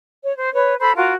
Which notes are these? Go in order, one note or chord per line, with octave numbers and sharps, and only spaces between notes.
C#5
C5
B4 C#5
A4 C5 B5
F4 F#4 A#4